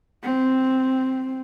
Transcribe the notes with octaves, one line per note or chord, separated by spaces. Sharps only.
C4